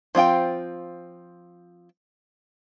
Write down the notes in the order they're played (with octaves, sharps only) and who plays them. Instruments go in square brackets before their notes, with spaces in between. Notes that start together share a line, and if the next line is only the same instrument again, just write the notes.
[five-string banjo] F3 C4 F4 G5